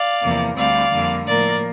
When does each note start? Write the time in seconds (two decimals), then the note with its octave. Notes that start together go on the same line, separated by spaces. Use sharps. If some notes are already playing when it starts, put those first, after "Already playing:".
Already playing: D5 F5
0.21 E2 C3 F3 A#3
0.56 D2 D3 G3 C4 D5 F5
0.91 F2 D3 G3 A#3
1.26 A2 F3 A#3 A#4 D5